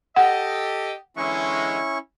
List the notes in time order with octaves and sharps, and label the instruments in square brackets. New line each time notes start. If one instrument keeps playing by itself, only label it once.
[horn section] G4 A4 D#5 [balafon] F#5
[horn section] D3 E3 G#3 [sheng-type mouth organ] C#4 E4 C#6